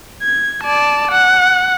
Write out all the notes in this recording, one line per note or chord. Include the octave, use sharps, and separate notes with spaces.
G#6
D5 A5
F#5